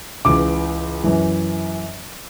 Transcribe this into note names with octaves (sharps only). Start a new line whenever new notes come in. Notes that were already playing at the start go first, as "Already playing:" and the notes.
C#2 C#3 E3 D6
F#2 E3